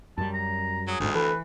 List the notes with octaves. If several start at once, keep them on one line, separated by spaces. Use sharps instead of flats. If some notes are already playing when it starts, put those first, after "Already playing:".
F#2 G3 A5
A#5
F#3 G#4
G1 D2 G#2
E3 A4 B4